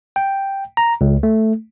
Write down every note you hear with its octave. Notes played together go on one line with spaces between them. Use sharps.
G5
A#5
C#2
A3